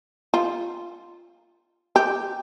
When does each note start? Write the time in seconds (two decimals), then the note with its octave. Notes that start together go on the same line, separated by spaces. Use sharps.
0.34 F4
1.96 G4